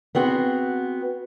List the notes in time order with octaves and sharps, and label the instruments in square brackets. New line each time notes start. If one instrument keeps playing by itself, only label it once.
[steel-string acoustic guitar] B3 C4 F#4 G#4